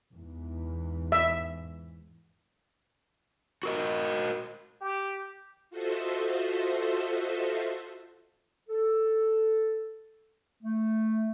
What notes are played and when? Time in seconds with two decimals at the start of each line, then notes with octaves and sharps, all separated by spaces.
0.14 E2 G#2 E3
1.12 E5
3.63 F#4 A#4 D#5
4.81 G4
5.70 F4 F#4 A4 C5 D#5 E5
8.69 A4
10.63 A3